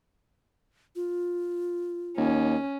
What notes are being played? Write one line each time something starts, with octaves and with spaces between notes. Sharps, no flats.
F4
D#2 C#4